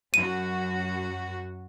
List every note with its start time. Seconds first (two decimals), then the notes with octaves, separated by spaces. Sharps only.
0.14 F#2 F#4 D#7